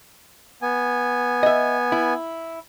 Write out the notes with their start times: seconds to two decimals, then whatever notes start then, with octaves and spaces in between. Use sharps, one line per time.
0.62 B3 G#5
1.43 D#5 E5
1.92 E4